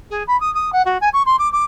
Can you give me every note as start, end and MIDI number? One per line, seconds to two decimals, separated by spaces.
0.10 0.23 68
0.27 0.39 83
0.40 0.52 87
0.54 0.70 87
0.73 0.82 78
0.85 0.98 66
1.01 1.09 80
1.13 1.23 85
1.26 1.36 84
1.39 1.51 86
1.52 1.64 86